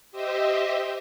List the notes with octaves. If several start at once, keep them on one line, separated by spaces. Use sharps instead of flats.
G4 C5 D#5 E5